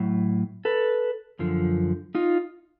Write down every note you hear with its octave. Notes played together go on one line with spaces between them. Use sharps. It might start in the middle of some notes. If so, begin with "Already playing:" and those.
Already playing: A2 F#3
A4 B4
F#2 D3 F3
D#4 F4